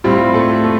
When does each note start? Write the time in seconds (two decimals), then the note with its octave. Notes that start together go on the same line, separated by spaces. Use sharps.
0.04 A2 G3 C4 F4
0.34 A3 A4
0.64 A3